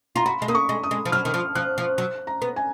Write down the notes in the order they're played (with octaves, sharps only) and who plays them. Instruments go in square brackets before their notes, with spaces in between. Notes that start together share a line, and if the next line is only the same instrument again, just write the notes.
[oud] F4 [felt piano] A#5
[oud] F#4 [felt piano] B5
[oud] G#3
[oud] A#3 [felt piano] D#6
[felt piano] C#6
[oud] G#3
[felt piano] D#6
[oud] G#3
F3
[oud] F#3 [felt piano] F6
[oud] D#3
F3
[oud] F3 [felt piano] F#6
[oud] F3
F#3
[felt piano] A#5
[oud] B3
[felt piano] G#5